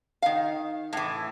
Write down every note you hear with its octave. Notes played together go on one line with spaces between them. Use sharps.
D#3 F5
A2 E3